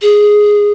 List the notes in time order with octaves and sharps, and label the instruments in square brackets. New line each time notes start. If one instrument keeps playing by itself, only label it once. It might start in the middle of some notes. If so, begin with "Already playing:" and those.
[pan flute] G#4